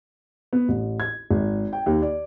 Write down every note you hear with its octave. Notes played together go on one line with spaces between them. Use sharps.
B3
A1
G#6
G#1
G5
D#2
D5